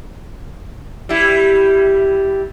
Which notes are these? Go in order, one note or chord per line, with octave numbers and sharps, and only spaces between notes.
G3 E4